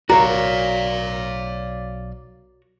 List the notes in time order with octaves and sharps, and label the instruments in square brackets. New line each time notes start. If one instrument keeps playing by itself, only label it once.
[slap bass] B1 C#3 [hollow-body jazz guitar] F#4 A#4 C#5 [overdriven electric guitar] D5 F5 [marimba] A#5